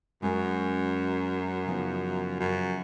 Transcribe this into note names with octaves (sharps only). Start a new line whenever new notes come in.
F#2 G#3 C#4 F#4 A#4 C#5
C#3 F3 B3 D#4
F#2